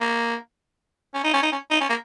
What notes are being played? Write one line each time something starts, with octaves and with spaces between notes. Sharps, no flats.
A#3
C#4
D#4
C#4
D#4
C#4
D#4
C#4
A#3